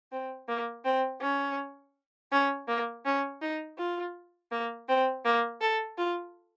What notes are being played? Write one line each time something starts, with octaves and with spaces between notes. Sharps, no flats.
C4
A#3
C4
C#4
C#4
A#3
C#4
D#4
F4
A#3
C4
A#3
A4
F4